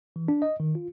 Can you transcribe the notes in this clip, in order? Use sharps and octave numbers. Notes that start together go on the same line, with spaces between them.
E3
D4
D#5
D#3
F4